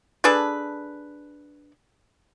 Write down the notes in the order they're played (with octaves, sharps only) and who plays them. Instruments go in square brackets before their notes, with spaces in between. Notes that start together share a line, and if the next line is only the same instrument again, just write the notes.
[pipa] D4 G#4 A4 B4